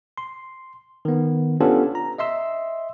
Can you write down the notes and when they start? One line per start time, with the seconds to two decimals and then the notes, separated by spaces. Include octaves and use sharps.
0.18 C6
1.05 D#3 B3
1.60 B3 C#4 D4 F4 G4 A4
1.95 A#5
2.18 D#5 E5 C6 E6